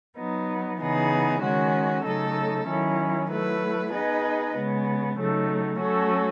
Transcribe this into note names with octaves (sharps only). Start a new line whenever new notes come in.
F#3 B3 D#4
C#3 E3 B3 D#4 G#4
D#3 G#3 C#4 F#4
C#3 F#3 A3 D#4 A4
D#3 F#3 C#4 E4
F#3 A3 E4 B4
B3 D#4 G#4 B4 D#5
C#3 G#3 B3
C#3 F#3 A3 D#4
F#3 A3 C#4 F#4 A4